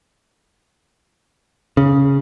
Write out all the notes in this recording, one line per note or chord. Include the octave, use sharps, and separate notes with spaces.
C#3